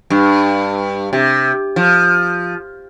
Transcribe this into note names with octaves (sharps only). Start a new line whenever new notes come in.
G2
C3
F3